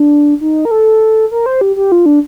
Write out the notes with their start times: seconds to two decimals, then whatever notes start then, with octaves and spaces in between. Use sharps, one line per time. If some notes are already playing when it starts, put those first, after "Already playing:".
Already playing: D4
0.41 D#4
0.65 A#4
0.71 A4
1.31 A#4
1.46 C5
1.61 G4
1.76 G4
1.92 F4
2.06 D4